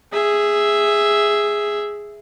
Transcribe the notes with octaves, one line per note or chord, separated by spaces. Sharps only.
G#4 E5